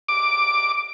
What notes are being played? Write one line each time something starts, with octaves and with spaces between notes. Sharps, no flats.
D6